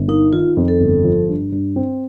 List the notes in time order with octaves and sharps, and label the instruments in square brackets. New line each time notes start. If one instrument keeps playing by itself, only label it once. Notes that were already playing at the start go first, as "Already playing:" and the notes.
Already playing: [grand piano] G1
[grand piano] A#3 [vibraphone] D#4
[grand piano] D#3 [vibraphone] F4
[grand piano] F2
[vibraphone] A4
[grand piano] G1
F3
G2
G2
C4